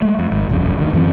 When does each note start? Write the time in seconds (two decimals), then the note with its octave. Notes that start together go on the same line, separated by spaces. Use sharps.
0.02 G#3 A3
0.19 F2
0.31 G#1 G#2
0.49 E1 A#1 F#2
0.78 D2 D#3
0.93 F#2 E3 G#3 C4